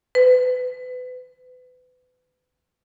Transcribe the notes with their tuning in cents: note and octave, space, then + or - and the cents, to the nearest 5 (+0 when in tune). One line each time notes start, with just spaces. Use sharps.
B4 +30